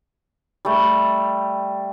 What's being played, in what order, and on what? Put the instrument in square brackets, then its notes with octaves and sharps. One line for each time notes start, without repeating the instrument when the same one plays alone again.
[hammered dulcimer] G3 A3